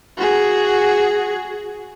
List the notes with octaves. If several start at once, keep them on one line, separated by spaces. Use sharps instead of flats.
F#4 G#4